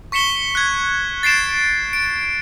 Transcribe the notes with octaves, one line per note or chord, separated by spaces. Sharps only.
C#6 B6 C#7 E7 G7
F#6 G#6
A6 C7 D7 E7
D7